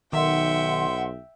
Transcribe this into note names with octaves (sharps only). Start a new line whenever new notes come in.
B1 D#3 E5 F#5 G5 C6